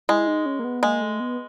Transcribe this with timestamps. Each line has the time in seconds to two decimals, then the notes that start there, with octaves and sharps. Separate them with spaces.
0.09 G#3 E4
0.27 D#4
0.46 C#4
0.59 A#3
0.64 B3
0.83 G#3 A#3
1.01 A3
1.20 B3